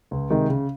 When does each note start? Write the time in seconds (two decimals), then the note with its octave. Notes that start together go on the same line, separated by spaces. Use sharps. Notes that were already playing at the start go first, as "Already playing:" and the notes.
0.11 C#2
0.30 C3 D#3 G#3 D#4
0.49 C#3